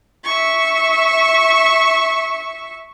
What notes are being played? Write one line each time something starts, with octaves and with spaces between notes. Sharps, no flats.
E5 C#6